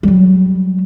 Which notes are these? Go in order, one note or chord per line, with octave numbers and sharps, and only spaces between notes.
F#3 G3